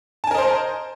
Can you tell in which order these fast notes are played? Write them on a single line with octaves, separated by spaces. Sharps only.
A5 G#5 A#4 D#5 C5